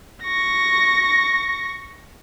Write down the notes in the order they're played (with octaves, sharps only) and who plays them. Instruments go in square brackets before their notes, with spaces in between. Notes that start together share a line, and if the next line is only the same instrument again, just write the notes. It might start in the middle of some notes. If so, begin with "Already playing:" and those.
[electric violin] C#6 A#6